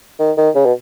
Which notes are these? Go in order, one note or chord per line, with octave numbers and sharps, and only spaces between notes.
D#3
D#3
C#3
B2